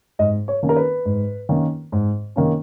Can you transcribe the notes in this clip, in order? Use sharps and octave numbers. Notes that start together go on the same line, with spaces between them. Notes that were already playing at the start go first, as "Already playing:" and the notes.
G#2 D#5
C#5
D#3 A#3 C#4
A#4
B4
G#2
D#3 A#3 C#4
G#2
D#3 A#3 C#4